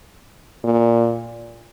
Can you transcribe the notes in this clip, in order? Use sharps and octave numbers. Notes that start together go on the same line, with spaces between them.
A#2